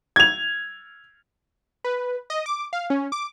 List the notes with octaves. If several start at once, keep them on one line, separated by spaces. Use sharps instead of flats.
G#6 F7
B4
D#5
D6
F5
C#4
D6